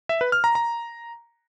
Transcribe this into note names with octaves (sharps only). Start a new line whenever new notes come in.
E5
B4
F6
A#5
A#5